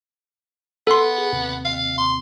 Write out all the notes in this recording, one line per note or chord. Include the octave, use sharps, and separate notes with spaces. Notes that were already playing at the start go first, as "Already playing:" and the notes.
B3 A4 C6
G#4
D#2 C3
F5
C6